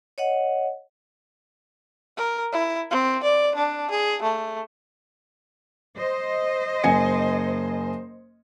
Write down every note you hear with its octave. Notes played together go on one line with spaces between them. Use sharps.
C#5 D#5 F#5
A#4
E4
C4
D5
D4
G#4
A3
C5 D#5
F#1 G#5 C#7